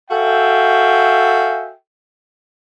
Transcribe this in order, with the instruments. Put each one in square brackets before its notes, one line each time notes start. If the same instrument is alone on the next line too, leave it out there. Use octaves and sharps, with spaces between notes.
[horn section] F#4 A4 E5 F5 G5 G#5